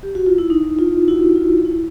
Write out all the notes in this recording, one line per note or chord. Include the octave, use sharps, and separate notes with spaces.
G4
F#4
F4
E4
D#4
F4
E4 F#4
F4
E4